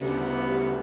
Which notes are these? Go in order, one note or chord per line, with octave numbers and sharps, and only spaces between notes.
D2 C#3 G3 B3 G4